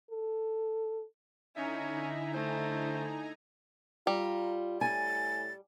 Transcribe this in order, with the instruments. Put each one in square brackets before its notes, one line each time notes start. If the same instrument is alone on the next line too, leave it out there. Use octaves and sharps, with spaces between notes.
[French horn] A4
[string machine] D3 E4 [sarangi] C#4 [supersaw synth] D#4 G#5 A#5 [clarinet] E5
[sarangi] A3 [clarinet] C5
[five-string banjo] G3 [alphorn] F4 [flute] A#5
[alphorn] A2 [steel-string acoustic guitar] G#5 [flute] A6